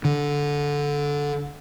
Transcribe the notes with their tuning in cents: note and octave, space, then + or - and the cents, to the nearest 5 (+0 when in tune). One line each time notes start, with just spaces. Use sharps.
D3 -15